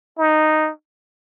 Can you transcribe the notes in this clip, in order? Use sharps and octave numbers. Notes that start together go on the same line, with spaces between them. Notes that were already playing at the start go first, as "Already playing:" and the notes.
D#4